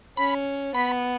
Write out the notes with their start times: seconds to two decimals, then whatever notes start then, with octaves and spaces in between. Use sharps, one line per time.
0.17 C#4 B5
0.75 B3 B5